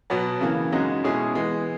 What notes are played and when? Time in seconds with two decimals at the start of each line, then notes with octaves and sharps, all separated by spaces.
0.10 B2 F#3 B3
0.41 C#3 E3 A#3
0.72 F#2 C#3 G#3 D#4 F#4
1.04 B2 G#3 C#4 E4 G#4
1.35 E3 G#3 B3